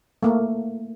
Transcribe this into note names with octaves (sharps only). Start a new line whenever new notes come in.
A3 A#3